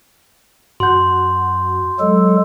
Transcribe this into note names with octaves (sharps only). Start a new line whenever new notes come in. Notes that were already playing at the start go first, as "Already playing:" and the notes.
F#2 F#4 F#5 C6 G6
F#3 G#3 A4